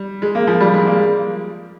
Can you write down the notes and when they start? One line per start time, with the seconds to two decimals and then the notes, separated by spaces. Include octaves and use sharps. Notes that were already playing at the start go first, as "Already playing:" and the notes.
Already playing: G3
0.22 G#3
0.35 A#3
0.47 F3
0.61 G3
0.74 G#3
0.87 A#3